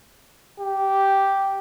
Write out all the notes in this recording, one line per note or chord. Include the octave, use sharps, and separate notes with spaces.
G4